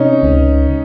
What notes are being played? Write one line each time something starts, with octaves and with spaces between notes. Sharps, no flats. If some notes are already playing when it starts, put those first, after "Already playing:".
Already playing: C3 C#4 D#4
C#2